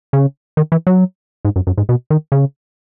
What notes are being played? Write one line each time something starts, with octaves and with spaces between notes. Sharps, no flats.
C#3
D#3
E3
F#3
G#2
F#2
F#2
G#2
B2
D#3
C#3